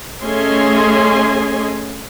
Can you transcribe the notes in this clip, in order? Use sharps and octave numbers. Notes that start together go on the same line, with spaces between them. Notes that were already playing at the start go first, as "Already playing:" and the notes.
A3 C#4 G#4 D#5 G#5 C6